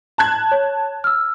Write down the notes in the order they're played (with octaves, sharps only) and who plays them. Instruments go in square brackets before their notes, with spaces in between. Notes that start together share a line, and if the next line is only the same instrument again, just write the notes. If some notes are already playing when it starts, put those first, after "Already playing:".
[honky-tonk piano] A5 F#6 G#6
[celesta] C#5
E6 F6